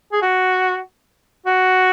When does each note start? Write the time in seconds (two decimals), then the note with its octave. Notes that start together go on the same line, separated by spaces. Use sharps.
0.12 G#4
0.22 F#4
1.46 F#4